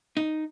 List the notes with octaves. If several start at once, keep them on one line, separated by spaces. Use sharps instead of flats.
D#4